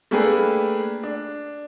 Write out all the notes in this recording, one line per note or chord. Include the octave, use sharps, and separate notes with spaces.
A3 A#3 D4 G4 G#4 B4
D4